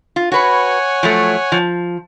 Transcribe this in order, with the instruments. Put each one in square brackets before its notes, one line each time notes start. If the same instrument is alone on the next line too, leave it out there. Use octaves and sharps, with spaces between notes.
[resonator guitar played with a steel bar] F4
[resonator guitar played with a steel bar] F#4 B4 [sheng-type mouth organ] C#5 F#5 G#5
[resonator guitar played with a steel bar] F3 F#3 A3
F3